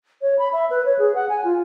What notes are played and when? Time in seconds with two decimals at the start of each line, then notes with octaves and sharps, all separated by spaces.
0.22 C#5
0.39 B5
0.53 E5
0.70 B4
0.85 C#5
0.99 G#4
1.15 F#5
1.29 G#5
1.44 F4